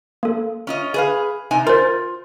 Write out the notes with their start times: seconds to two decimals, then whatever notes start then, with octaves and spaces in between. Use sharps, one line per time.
0.23 A#3 A4
0.67 C#4 F4 D#5
0.94 G#4 B4 F5
1.51 C3 D#4 G#5
1.67 F4 A#4 C5